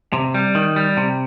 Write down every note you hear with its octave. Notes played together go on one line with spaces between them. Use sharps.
C3
G3
D#3
G3
C3